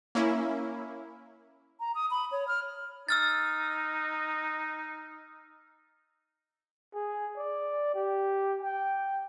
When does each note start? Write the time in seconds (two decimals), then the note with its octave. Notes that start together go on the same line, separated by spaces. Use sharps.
0.15 A#3 C#4 E4
1.80 A#5
1.95 D#6
2.11 B5
2.32 C#5
2.48 F6
3.09 D#4 E6 F6 A6
6.94 G#4
7.37 D5
7.94 G4
8.61 G5